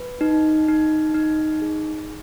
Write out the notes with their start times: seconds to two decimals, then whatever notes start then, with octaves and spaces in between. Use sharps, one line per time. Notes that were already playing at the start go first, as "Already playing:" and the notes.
Already playing: B4
0.21 D#4
0.68 D#4
1.15 D#4
1.62 G#4